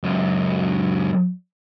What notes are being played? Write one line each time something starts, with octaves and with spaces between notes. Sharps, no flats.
C#2 F#2